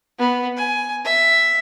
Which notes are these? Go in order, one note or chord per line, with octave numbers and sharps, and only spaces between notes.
B3
G#5
E5